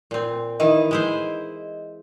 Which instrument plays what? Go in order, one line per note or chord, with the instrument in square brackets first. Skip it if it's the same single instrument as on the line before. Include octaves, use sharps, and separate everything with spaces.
[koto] A#2 C4
[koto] D#3 E3 E4 [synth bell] D#5
[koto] G#3 E4 C5